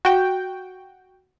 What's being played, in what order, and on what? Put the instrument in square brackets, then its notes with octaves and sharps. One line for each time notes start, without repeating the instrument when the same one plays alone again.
[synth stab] F#4 G5